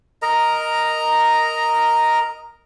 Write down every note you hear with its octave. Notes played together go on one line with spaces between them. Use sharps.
A#4 D#5 A#5